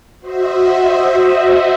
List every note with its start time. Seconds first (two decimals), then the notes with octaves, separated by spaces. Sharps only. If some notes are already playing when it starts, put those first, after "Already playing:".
0.19 F#4 C5 D#5 E5